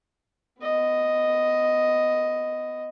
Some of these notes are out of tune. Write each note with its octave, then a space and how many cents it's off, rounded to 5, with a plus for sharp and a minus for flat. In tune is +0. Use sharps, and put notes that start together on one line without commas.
B3 +30 D#5 +0